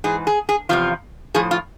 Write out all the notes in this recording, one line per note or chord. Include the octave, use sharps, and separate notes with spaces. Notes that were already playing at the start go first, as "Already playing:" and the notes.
G#2 E3 G#4
G#4
G#4
E2 C3 F3 F4
A2 F3 G#4
F4